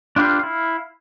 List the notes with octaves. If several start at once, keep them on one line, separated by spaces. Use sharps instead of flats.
D4 F4 G4 B4 F5
E4 F5